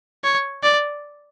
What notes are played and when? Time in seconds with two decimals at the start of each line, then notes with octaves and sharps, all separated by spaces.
0.24 C#5
0.63 D5